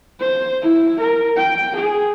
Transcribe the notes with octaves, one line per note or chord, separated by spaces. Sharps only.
C5
E4
A#4
G5
G#4